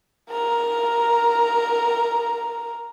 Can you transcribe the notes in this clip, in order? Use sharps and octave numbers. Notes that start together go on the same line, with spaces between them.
A#4 A#5